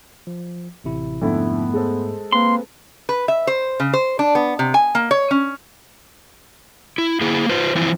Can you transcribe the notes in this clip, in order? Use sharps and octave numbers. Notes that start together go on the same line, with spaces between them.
F3
A1 C3 E4
F2 G#2 D3 A3 B3 E4
G#3 A4 C5
A#3 C4 B4 C6
B4
E5
C5
C#3
C5
D4
B3
C3
G#5
A#3
C#5
C#4
E4
A#3 E4 G#4
F4 B4 C5
E3 F3 C4 E4